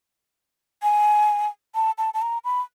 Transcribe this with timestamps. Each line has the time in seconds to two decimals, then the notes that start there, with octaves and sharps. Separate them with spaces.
0.83 G#5
1.75 A5
1.98 A5
2.14 A5
2.22 A#5
2.44 B5